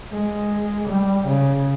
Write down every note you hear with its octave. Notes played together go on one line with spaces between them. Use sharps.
G#3
G3
C#3